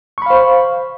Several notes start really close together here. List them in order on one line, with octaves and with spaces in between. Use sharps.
C#6 B5 F5 C5